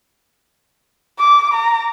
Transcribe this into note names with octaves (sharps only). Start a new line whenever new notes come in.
D6
A#5